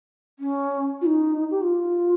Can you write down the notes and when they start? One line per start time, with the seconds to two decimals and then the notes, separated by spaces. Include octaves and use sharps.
0.39 C#4
1.01 F4
1.06 D#4
1.51 G4
1.62 F4